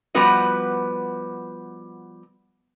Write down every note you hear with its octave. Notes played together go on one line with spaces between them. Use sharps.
F3 G3 B3 F#4 B4 D#5